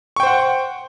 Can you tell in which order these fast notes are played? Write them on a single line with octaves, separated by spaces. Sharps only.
C#6 G5 C5 F#5